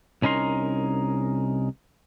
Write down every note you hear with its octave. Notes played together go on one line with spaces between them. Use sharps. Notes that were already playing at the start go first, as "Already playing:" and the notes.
C2 C#4 D#4 A#4 C6